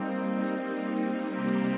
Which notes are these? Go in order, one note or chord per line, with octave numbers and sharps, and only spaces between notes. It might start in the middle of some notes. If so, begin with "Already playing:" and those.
Already playing: G3 A#3 C4 D#4
C3 G3 A#3 C4 D#4 G4